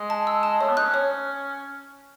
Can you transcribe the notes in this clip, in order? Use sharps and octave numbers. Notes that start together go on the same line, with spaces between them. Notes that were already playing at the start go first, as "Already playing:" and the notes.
Already playing: G#3
A5
E6
A5
A3 C#5
B3
D#4 F#6
C#4
C#5